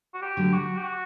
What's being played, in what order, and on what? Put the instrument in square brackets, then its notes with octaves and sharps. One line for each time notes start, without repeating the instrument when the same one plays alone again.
[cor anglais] F#4
G4
[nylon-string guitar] D3 F#3 A3
[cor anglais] F#4
G4
F#4